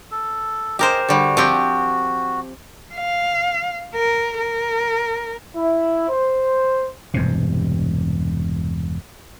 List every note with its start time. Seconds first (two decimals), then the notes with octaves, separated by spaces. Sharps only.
0.11 A4
0.79 G4 G#4 A#4 C5 D#5
1.08 D3 G3 F#4
1.37 F3 C4 G4
2.95 F5
3.95 A#4
4.38 A#4
5.56 E4
6.09 C5
7.14 E1 G2 C3